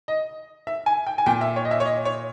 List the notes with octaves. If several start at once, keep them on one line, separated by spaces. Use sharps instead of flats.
D#5
E5
G#5
G5
G#5
A#2 G5
E5
C#5
D#5
E5
C#5
D#5
C#5